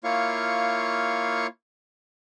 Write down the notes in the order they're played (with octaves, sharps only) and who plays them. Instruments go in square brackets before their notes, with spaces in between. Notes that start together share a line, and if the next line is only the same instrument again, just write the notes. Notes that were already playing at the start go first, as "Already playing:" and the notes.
[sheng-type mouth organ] A#3 E4 F4 C#5 F5 C#6